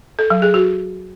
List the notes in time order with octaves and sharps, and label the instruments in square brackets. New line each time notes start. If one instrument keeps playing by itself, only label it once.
[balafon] A4
F#3
G#4
F#4